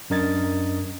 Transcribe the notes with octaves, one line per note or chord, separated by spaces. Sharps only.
F#2 D4 A#4 D#5 G#6 A6